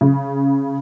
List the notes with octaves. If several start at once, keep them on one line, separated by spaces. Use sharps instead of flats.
C#3